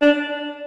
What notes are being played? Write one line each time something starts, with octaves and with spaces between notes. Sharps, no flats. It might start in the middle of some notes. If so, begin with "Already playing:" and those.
D4